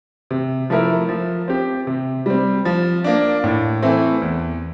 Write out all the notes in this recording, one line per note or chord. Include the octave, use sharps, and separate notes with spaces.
C3
F3 A3 E4 A#4
F3
C4 G4
C3
G3 C4
F3
A#3 D4
A2
E3 A3 C4
E2